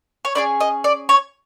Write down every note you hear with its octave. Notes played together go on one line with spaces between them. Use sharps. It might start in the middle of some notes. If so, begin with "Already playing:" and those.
C#5
C#4 E4 G#4 D5
D#5
D5
C#5